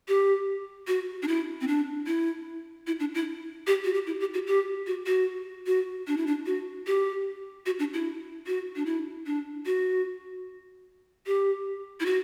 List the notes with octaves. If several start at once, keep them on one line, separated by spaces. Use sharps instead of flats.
G4
F#4
D4
E4
C4
D4
E4
E4
D4
E4
G4
F#4
G4
E4
G4
F#4
G4
F#4
F#4
F#4
D4
E4
D4
F#4
G4
F#4
D4
E4
F#4
D4
E4
D4
F#4
G4
E4
F#4